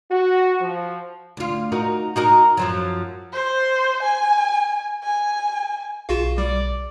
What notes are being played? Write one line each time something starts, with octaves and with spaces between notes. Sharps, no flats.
F#4
F3
D2 F4
D#4 F#4 A#4
D#4 F#4 A#4
F#2 F3 F#3
C5
G#5
G#5
B1 F4 F#4 G#4 F5 E7
G3 D5